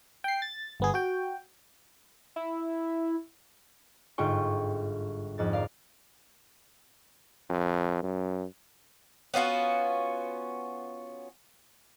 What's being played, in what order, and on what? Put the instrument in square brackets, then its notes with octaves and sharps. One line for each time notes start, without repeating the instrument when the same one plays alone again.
[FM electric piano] G5 C7
A6
G1 B3 G#4
F#4 G5
[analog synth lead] E4
[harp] G1 G#2 F4 G5 C#6
F2 G#2 A6
A#4 D5 F5
[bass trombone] F2
F#2
[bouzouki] B3 C#4 F4 F#4